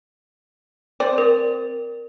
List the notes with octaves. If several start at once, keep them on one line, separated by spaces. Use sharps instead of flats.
C4 C5 D5
A#4